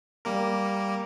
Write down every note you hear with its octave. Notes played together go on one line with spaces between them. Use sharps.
G3 A#3 A#4